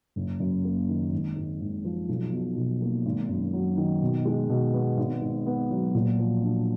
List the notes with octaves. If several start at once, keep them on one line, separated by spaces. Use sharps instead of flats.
F#1
F#2
A#3
D#3
G#1
G#2
G#1
F3
B1
B2
B1
A#3
G#1
F#2
F#3
D#3
B2
G#3
B2
B3
G#1
G#2
B3
F#3
A#2
F3
D4